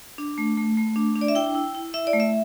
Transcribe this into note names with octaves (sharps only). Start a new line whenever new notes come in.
D4
A3
A3
A3
D4
D4
D5
E5
E4 G5
E4
E4
E4 E5
D5
A3
E5